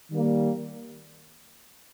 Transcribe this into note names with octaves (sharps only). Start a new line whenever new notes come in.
D#3 G3 A#3